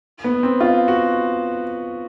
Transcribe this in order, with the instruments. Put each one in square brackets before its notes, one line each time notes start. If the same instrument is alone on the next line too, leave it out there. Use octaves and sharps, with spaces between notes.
[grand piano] B3
C4
F4
F#4